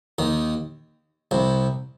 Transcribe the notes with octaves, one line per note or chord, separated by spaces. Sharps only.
D#2 D#3
C2 C3